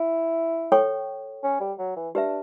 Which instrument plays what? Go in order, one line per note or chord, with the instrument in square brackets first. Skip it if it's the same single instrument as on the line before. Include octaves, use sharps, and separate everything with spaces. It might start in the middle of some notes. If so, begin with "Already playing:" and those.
Already playing: [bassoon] E4
[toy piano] A4 C#5 G5 C#6
[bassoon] C#4
G3
F#3
E3
[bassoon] D4 [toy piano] G4 B4 E5